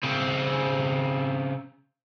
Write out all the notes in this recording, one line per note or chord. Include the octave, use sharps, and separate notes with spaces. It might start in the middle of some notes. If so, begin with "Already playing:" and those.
C#3 C4